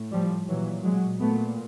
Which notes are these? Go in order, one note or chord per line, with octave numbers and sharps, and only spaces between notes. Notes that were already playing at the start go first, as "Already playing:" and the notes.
Already playing: A2
F3 G3
A#2 E3 F#3
F#3 G#3
A#2 A3 B3